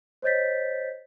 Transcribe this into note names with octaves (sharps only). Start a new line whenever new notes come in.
C5 C#5 D#5 G6 A6 B6